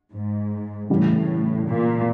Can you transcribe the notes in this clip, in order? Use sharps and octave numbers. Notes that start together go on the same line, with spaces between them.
G#2
A2 C#3 E3 G3
A#2